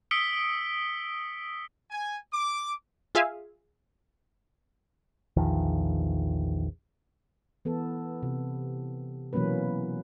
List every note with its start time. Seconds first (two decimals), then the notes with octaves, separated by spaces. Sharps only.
0.11 D#6 E6 B6 C#7 D7 G7
1.91 G#5
2.33 D6
3.15 F4 G#4 E5 F5 G#5
5.37 A#1 E2 D#3 F3
7.65 E3 B3 A4
8.23 C3
9.33 B2 E3 F#3 A#3 C#4 B4